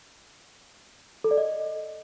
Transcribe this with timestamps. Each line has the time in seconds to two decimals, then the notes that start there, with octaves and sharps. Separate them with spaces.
1.24 A4
1.31 D5
1.37 D#5